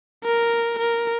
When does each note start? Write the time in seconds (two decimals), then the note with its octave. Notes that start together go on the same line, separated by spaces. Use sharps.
0.24 A#4
0.79 A#4